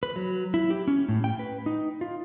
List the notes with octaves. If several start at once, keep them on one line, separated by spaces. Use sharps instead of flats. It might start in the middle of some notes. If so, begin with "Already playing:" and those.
B4
F#3
E4
G4
C#4
A2
G5
B4
D#4
F4